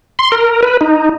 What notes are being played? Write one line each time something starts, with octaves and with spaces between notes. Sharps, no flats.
C6
A#4
B4
D#4